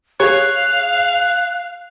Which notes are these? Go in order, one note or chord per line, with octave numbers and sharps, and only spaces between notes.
G#4 C#5 F5 F#6